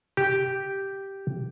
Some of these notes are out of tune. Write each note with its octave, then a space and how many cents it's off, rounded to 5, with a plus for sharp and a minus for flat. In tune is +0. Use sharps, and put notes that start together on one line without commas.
G4 -5